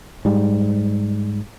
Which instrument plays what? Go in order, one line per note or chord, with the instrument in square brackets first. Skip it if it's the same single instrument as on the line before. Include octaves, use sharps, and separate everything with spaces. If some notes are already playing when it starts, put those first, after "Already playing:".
[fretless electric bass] G#2 G3